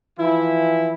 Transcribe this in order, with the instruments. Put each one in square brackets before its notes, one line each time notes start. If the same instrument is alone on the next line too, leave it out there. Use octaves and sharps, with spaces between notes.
[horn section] E3 F3 E4